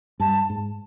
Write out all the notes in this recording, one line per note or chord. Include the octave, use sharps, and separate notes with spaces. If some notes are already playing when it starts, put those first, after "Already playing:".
G2 A5
G#2